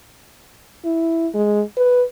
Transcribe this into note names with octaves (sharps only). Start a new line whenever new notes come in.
E4
G#3
B4